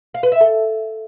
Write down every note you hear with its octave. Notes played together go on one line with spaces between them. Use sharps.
F5
B4
E5
A4